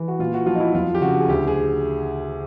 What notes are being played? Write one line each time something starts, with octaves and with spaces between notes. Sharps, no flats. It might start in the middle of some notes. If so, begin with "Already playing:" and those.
Already playing: E3
F#4
A#2 F4
F#4
F3 F4
D#4
E4
F2 F4
G4
C#3 F#4
G#4
D2 G4
G#4